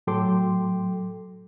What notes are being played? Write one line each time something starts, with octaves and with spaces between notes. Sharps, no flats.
A2 F#3 A4 G5 C6 D6